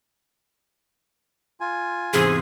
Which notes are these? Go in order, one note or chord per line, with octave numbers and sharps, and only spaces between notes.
F4 G#5
E2 G#2 C3 G#4